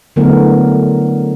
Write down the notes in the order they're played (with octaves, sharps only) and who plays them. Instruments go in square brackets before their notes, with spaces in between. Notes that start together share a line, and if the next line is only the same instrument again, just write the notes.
[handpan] D3 F#3 A3 B3 E4 A#4